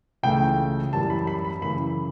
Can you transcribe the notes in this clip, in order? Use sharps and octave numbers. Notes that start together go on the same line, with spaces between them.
C#2 C#3 E3 A3 G5
F#2 E3 G3 A5
B5
B5
B5
F#2 C#3 E3 B5